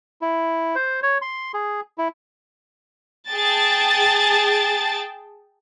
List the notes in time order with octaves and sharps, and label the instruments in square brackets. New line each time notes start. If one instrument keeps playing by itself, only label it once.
[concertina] E4
C5
C#5
C6
G#4
E4
[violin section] G#4 G5 A5 A6